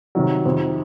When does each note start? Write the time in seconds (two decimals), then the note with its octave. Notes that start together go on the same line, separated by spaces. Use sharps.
0.15 C3 D#3 F#3
0.45 F2 C3 D#3